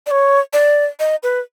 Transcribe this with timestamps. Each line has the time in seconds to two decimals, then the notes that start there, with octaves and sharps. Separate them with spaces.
0.06 D5
0.11 C#5
0.53 D5
0.99 D#5
1.23 B4